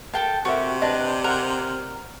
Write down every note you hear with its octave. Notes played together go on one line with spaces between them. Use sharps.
A4 A#4 F5 G5 A5
C3 F#4 G4 A4 A#4 E5
D4 B4 D5 D#5
A#4 F#5